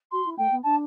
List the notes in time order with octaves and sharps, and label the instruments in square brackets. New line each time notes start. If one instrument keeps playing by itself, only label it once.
[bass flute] F#4 [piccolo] C6
[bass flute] E4
[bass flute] A3 [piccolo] G5
[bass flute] B3
[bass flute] D4 [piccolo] A5